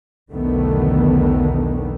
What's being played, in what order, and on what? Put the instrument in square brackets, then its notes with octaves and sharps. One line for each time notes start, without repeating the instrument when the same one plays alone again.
[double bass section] B1 E2 D3 D#3 A3 B3